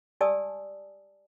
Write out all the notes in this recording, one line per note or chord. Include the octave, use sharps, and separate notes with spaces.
G4 D5 G#5 A5 D#6 E6